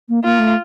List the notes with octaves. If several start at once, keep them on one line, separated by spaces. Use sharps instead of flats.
A#3
A#3 F4
A3